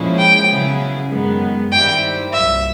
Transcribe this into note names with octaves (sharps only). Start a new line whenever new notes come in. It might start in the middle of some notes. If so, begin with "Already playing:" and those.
Already playing: A#2 F3 G#3 C#4 E4
G5
C#3 F#3 B3 E4 G#4
F#2 D#3 G#3 B3
G2 D#3 G3 C4 E4 G5
C2 A#2 F#3 E5